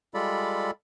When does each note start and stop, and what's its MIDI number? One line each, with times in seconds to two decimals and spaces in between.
0.14 0.71 55
0.14 0.71 56
0.14 0.71 65
0.14 0.71 69
0.14 0.71 74
0.14 0.71 83